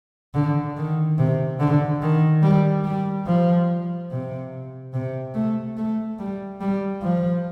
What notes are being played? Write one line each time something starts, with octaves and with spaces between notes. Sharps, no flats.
D3
D#3
C3
D3
D#3
G3
G3
F3
C3
C3
A3
A3
G3
G3
F3